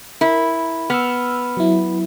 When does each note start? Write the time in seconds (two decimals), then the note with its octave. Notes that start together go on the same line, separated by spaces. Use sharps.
0.21 E4 A#4
0.90 B3 E6 F6
1.57 F#3 E4